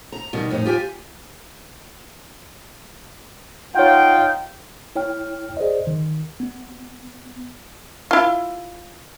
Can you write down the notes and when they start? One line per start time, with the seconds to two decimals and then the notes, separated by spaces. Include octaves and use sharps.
0.12 A#5
0.33 B2 D#3 E3 G3
0.51 F2 A2 D#4
0.65 F4 G4 G5 G#5
3.75 D#4 F4 C#5 F#5 G5
4.96 E4 C#5 G5 F6
5.57 G#4 C5 D5 D#5
5.87 D#3
6.40 B3
8.11 E4 F4